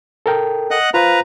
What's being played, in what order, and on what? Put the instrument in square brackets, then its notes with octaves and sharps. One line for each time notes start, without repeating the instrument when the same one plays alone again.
[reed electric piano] A4 A#4 G5
[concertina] D#5 F#5 F#6
[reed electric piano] F4 C5 F5 [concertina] B4 A#5